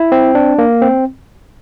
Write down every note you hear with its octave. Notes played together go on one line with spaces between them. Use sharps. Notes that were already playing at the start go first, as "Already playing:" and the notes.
Already playing: E4
C4
D4
A#3
C4